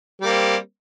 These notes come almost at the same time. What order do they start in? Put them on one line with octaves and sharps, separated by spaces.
G3 A#3 C4